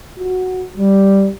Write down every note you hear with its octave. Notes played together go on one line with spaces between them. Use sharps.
F#4
G3